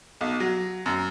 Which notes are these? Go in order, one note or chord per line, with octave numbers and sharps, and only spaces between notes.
B1
F#3
F#2